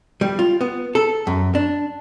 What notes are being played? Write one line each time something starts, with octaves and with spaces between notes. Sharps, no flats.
G3
F4
B3
A4
F#2
D4